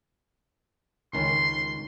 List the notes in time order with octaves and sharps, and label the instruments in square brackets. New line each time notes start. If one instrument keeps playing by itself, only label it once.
[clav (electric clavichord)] C#2 D#3 C#4 [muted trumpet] C6